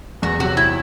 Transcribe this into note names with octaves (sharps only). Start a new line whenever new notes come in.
E2 F#4
C3 F#3 F#4
E4